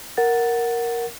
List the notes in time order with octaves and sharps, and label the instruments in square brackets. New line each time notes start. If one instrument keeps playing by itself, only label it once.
[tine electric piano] A#4 F#5 A6